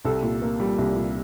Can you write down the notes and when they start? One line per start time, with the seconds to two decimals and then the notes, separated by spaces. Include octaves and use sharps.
0.05 C2 A4
0.22 A#2
0.42 A#3
0.60 G3
0.78 C2
0.96 A#2